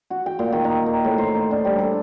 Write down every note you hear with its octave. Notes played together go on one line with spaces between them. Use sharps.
F#4
G5
A#2
D#3
D#4
A#4
A2
C5
D#4
D4
G3
A4